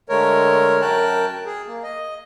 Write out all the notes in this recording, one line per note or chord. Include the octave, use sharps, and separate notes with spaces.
D3 G#3 A3 A#4 C#5
F#2 A#4 G5 A5 F#6
G#4
A#3
D#5